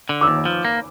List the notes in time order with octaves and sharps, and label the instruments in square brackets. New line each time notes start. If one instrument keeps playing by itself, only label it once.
[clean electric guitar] D3
[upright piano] D6 E6
[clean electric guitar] D#2
F3
A#3